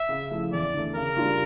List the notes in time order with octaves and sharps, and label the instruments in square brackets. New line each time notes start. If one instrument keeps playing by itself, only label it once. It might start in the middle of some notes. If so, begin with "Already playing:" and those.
Already playing: [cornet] E5
[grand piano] C#3
F3 A3 E4
[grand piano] E2 [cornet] D5
[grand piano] D3 A3
[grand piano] C#3 [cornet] A#4
[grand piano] G3 D4 F4